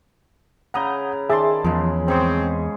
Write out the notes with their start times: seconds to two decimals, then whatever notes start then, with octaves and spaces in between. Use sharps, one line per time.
0.74 C#3 E4 F#5 A#5 D#6 G6
1.30 D#3 G#4 D5 E5 A5 C6
1.64 E2 C#3 F3 G#3
2.08 G#2 C4 G#4 C#6